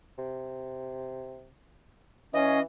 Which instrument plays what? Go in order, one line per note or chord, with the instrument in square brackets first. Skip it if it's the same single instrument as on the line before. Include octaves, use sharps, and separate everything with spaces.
[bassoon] C3
[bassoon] E3 [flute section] C#4 F5 [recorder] D#5